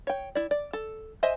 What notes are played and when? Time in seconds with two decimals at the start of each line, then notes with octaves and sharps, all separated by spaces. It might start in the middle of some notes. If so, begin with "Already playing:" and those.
0.07 C#5 G5
0.35 E4 D5
0.51 D5
0.73 A4
1.23 C5 D#5 E5 G#5